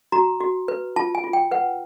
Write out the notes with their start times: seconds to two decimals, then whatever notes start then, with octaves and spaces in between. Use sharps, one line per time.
0.12 F#4 A#5
0.41 F#4
0.68 B4
0.96 F4 A5
1.15 G#5
1.24 F4
1.33 G5
1.51 B4 F#5